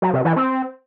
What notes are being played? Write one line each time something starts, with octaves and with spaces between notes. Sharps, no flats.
F#3
C3
E3
C4